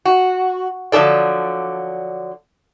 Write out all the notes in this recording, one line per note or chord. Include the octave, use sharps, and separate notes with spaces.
F#4
D3 F3 F#3 D4 A4 D5